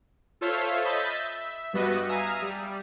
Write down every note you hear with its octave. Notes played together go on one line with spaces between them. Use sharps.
F4 A4 C5 C#5 E5 F5
D#5 E5 B5 G6 A6 B6
E5
G2 G3 B3 F#4 B4 D#5
E5 F5 G#5 A#5 D#6
G3